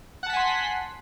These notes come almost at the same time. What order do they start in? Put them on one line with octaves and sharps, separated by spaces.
F#5 A5 B6 G#5 C6